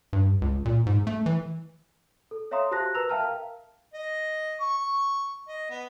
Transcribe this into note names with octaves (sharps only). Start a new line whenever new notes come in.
G2
C#2
A#2
G#2
A3
E3
A4
C#5 E5 F5 A#5 C6 D#6
F#4 G4 C5 A5 F#6 A#6
A#4 B4 A#5 E6 F7
E5 F5 G5 A5 A#5 F6
A#4 F5
D#5
C#6
D#5
B3